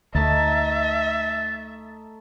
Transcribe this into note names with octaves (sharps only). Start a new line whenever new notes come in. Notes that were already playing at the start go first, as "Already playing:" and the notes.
D2 A3 D#4 E5 A6